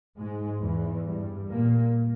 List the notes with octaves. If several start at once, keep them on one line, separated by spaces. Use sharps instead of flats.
G#2 G#3
E2 E3
G2 G3
A#2 A#3